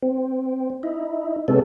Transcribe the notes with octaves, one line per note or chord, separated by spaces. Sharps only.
C4
D#4 E4
C3 G#3 B3 C#4 A4